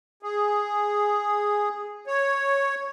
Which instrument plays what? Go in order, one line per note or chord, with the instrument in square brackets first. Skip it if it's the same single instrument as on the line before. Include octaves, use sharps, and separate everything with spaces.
[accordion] G#4
C#5